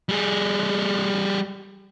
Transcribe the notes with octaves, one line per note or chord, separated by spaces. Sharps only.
G3 G#4